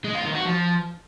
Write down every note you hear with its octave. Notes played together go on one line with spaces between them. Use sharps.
G#3
F4
D#3
F#4
F3